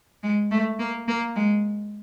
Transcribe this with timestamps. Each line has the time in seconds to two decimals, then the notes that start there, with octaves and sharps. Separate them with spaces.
0.23 G#3
0.51 A3
0.79 A#3
1.08 A#3
1.36 G#3